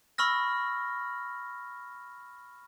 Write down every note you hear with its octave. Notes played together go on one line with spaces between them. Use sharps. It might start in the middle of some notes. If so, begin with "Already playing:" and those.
B5 C#6 E6 F6 A#6